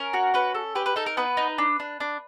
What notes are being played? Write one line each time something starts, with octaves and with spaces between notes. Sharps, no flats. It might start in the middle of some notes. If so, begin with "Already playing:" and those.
Already playing: C#4 A#4
F#4
C#4 B4
A4
G4 B4
B4
D#4 A4
A#4
B3 B4
D#4
D4
D4
D4